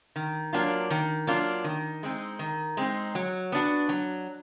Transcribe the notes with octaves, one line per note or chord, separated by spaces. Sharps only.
D#3
F#3 A#3 D4 F4
D#3
F#3 A#3 D4 F4
D#3
G#3 C4 D#4
D#3
G#3 C4 D#4
F#3
B3 D4 F#4
F#3